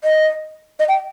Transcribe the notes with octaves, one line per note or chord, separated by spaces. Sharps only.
D#5
D#5
G5